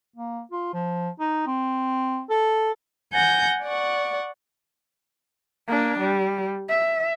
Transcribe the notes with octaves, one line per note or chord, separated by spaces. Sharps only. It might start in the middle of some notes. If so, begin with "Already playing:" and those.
A#3
F4
F3
D#4
C4
A4
F#5 G#5 G6 A#6
D5 F#5 C#6
A#3 D4
G3
E5